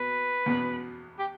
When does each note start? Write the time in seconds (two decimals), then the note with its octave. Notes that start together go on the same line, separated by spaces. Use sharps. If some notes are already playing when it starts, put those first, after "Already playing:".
Already playing: B2 B3 B4
0.46 E2 B2 B3
1.19 G4